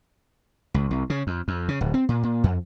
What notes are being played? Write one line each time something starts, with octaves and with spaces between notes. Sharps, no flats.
C#2
C2
C#3
F2
F2
C#3
D1
C4
A#2
A#2
F2